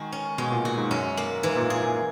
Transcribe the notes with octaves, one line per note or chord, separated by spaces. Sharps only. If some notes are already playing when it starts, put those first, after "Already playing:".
Already playing: D#3 G#3 F#4
C#4
B2 G#3
A#2
A#2 F#4
G#2
F#2 C#4
A#3
G#2 E3
A#2
A#2 G#4
A#2